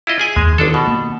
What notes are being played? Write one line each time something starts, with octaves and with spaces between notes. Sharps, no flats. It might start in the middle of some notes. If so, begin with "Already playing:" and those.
E4 F4 D#5
G#4 G#5
D#2 G#3
G1 D#3 D4 A4
B2
A#3